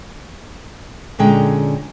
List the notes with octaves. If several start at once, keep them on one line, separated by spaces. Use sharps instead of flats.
A#2 D3 G#3 C#4 G5 A#5